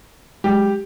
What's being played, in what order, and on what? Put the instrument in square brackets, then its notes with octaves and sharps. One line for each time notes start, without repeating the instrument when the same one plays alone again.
[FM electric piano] F#3 G#3 [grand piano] G4